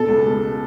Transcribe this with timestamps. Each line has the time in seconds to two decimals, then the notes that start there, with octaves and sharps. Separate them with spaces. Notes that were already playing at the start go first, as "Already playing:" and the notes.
Already playing: B2 A4
0.09 C#2
0.26 B2